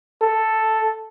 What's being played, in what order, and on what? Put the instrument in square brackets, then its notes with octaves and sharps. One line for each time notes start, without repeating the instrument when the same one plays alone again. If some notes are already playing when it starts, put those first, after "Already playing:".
[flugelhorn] A4